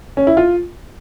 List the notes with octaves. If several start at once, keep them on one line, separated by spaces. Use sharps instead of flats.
C#4
E4
F4